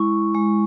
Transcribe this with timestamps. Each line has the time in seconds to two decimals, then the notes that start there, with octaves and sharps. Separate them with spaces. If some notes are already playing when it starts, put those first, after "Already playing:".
Already playing: G#3 E4 C#6
0.35 G#3